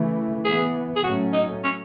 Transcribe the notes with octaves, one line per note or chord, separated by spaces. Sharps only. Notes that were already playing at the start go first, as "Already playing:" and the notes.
Already playing: C#3 E3 A3
E3 B3 G#4
G#4
A2 F#3 A3 C#4 F#4
D#4
C#4